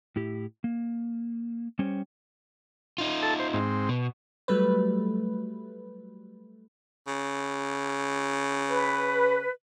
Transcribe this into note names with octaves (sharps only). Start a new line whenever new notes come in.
A2 E4 G4
A#3
G3 C#4 C5 C#5 G5
D#4 F4
A4 A5
C5
G#2 C4
B2
F#3 G3 A3 B4
C#3
B4